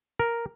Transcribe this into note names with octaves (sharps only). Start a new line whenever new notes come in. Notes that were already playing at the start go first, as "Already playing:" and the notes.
A#4